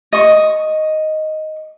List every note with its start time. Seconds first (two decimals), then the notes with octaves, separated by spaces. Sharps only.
0.13 D#5 C#6